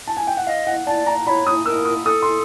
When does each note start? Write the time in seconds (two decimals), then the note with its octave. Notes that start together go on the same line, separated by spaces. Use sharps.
0.07 A5
0.17 G#5
0.27 G5
0.37 F#5
0.47 D#5 F5
0.67 F#5
0.86 D5 A5
1.06 A#5
1.26 C#5 D5 B5
1.47 D#6
1.66 A#4 E6
1.85 D#6
2.05 A4 D#6
2.22 C6